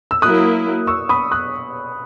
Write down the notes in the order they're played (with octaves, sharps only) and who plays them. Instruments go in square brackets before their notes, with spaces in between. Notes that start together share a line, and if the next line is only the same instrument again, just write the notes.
[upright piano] E6
[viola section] F#3 A#3 E4 [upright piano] D#6 F#6
[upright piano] C#6 E6
B5 D#6
D#6 F#6